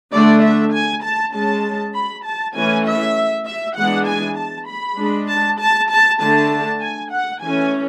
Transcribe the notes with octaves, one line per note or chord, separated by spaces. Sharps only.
D3 A3 D4 D5
E5
G#5
A5
G#3 C#4 A5
B5
A5
E3 A3 C#4 G#5
E5
E5
E3 G#3 B3 D4 F#5
G#5
A5
B5
G#3 D4
A5
A5
A5
D3 A3 D4 A5
G#5
F#5
E3 A3 C#4 G#5